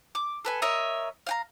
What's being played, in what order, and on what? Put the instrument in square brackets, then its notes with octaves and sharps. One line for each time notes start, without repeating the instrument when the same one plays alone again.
[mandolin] D6
A4 B4 G#5
A#4 C#5 D#5 E5
F5 G5 A#5